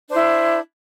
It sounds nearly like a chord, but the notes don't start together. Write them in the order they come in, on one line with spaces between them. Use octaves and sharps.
D4 C5 E4